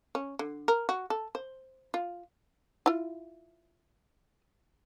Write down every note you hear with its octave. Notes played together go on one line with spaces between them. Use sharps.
C#4
D3
A#4
F#4
A4
C5
F4
E4 F4